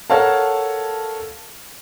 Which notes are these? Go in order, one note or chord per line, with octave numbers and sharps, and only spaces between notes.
A4 A#4 C#5 F5 F#5 A5